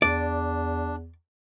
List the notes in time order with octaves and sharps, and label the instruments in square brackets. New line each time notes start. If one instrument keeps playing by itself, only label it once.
[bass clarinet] E2 [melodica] D4 [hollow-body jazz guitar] D5